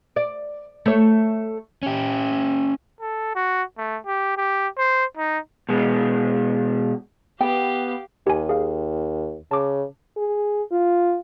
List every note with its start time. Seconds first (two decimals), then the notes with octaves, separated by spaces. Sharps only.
0.16 D5
0.86 A3 C#5
1.83 C#4 G4
3.01 A4
3.36 F#4
3.78 A3
4.06 G4
4.37 G4
4.78 C5
5.17 D#4
5.69 B2 G#3
7.41 B3 G4 F5 G5
8.27 D#2 G4 G#5
8.49 G#4 F5
9.51 C#3 A5 D6
10.16 G#4
10.72 F4